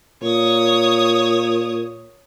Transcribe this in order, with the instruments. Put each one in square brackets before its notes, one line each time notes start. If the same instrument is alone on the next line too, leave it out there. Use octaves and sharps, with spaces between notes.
[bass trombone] A#2 [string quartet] C#5 D#6